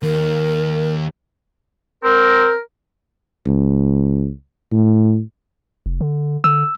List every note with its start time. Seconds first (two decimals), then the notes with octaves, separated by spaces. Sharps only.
0.03 D#2 A#4
2.04 C4 A#4
3.46 C#2
4.72 A2
5.86 F1
6.01 D3
6.44 D3 E6